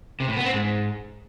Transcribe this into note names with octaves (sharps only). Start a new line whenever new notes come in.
C3
A2
B3
C4
G#2